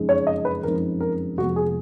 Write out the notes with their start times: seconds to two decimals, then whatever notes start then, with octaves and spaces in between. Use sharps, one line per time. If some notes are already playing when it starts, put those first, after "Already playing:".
Already playing: F#1 F2 C#3 G#3 D#4
0.09 C#5
0.27 D#5
0.45 B4
0.63 F#1 F2 C#3 G#3 D#4 A#4
1.00 A#4
1.37 F1 F2 F3 G#3 B3 F#4
1.56 G#4